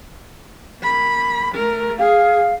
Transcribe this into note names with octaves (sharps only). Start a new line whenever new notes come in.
A#3 B5
A3 A#4
G#4 F5